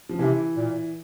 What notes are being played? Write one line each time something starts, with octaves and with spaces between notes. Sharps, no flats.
F3
C3 E3
A#2